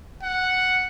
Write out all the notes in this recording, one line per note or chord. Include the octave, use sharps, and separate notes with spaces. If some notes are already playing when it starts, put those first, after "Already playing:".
F#5